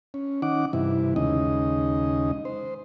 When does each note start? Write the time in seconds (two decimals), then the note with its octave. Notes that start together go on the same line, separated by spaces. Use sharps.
0.14 C#4
0.42 D#3 C#4 D#4 F#5 D6
0.73 G2 C3 E3 E4
1.16 D#2 C#3 G#3 D#4 D#5
2.45 C5